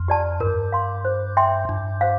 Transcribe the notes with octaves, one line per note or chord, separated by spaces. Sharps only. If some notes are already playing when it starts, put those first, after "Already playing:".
Already playing: F2
G4 D5 A5
G2 A#4
F5 C6
C5
E5 G5 C6
G2 D4
G4 C5 F5